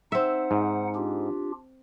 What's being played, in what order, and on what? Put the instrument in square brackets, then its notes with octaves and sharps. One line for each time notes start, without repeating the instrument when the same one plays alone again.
[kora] C4 E5 [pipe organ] D#4 F#5
[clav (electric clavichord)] G#2
[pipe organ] D4 F4 G4